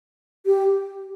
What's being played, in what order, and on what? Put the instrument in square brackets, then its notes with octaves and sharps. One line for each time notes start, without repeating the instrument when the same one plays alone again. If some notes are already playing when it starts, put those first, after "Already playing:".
[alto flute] G4